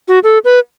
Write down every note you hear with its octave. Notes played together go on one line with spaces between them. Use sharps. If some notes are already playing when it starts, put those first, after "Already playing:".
F#4
A4
B4